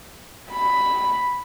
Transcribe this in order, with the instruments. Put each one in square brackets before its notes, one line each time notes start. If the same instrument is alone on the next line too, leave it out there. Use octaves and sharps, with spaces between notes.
[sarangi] B5